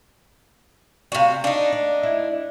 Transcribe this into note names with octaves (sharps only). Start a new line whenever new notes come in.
C3 F#4 D5 F5
D4 D#4
D5
E4